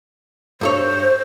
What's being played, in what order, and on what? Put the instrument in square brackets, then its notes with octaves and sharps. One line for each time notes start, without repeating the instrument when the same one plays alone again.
[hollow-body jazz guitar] G2 A4 C#5 [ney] C5